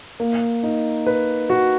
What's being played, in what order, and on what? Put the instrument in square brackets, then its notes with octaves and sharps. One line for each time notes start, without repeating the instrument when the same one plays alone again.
[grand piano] A#3
D#4
B4
F#4